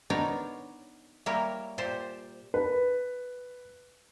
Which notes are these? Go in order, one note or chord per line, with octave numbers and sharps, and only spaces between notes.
B3 D4 D#4 A#4 C#5
G3 A#3 E4 A#4 C#5
A#2 G4 C5 A5
B4